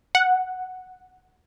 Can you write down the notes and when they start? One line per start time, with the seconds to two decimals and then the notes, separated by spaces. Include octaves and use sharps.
0.15 F#5